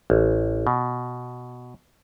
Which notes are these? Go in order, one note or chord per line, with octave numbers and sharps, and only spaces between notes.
A1
B2